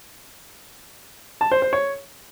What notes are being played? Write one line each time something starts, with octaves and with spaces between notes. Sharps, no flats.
A5
C5
C5
C#5